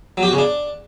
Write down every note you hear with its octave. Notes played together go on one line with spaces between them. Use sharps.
F#3
G4
F#4
C#3
D4